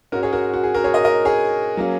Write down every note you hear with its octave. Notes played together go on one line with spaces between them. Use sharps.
G#2 G#3 C#4 F#4 A#4
G#4 C#5
F#4 A#4
F#4
G#4
F#4 A#4
G#4 C#5
A#4 D#5
A#4 D#5
G#4 C#5
F#3 A#3 C#4